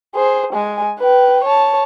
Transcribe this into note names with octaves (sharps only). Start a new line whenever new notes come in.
G#4 C5
G#3 G#5
B4 G5
C#5 A5